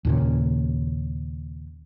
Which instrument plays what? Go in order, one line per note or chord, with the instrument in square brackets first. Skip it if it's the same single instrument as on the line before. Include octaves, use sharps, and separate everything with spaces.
[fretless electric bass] D#2 A#2 C#3